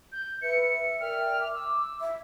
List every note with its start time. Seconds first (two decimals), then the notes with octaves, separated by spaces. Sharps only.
0.12 G6
0.42 B4 E5 C#7
1.00 A#4 D5 G5 F6
1.41 D6
1.55 E6
2.01 E5